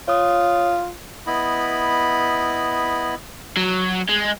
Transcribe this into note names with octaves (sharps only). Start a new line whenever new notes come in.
F4 C#5 D#6
B3 E4 D#5 B5
F#3
G#3